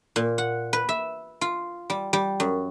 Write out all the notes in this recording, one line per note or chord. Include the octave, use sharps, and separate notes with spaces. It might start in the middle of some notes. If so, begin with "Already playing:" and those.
A#2
F#5
B4
E5
F4
G3
G3
F#2